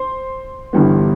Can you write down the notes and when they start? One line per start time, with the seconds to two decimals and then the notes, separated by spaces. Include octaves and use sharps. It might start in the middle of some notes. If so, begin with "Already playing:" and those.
Already playing: C5
0.73 G1 G2 E3 G3 B3